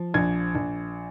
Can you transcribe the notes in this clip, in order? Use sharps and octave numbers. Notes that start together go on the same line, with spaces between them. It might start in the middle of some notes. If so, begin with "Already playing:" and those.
Already playing: F3
A#1 G#6
A#1